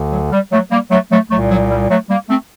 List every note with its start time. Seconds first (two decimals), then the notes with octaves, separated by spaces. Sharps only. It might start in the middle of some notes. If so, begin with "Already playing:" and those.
Already playing: D2 D3
0.12 F#3
0.32 G3
0.52 F#3 A3
0.71 G3 A#3
0.91 F#3 A3
1.11 F#3 A3
1.31 C2 A#2 F#3 A3
1.51 F#3
1.71 G3
1.90 F#3 A3
2.09 G3 A#3
2.29 A3 C4